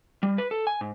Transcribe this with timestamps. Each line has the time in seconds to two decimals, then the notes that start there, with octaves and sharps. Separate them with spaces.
0.23 G3
0.38 B4
0.51 A4
0.67 G#5
0.81 G#2